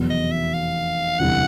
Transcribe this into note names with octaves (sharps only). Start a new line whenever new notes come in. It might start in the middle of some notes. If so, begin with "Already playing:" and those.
Already playing: F1 E2 B2 F#3
D#5
E5
F5
E1 D2 C3 E3 G3 F#5